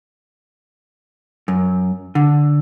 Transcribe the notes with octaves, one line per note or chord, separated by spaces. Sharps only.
F#2
D3